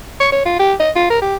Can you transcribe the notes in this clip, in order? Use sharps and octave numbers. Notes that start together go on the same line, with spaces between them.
C#6
C#5
F4
G4
D#5
F4
A#4
G4